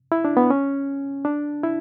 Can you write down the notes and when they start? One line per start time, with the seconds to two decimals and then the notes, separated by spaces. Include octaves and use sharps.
0.12 E4
0.25 D4
0.37 B3
0.50 C#4
1.25 D4
1.63 E4